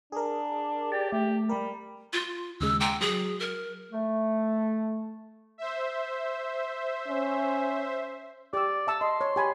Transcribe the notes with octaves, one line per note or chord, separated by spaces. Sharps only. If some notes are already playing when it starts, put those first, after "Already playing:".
D4 G#4 A#4
G4 D5
A3 G4
G3 A#4
F4
D#2 C#3 G#3 E6
G5 A#5 C6 D6
F#3 G#4
A#4
A3
C5 E5
C#4
G4 D5 E6
E5 A5 E6
D#5 C6
C#5
G4 G#5 B5